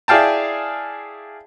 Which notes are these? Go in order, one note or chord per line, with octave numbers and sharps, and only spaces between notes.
E4 G#4 D5 F5 G5 A5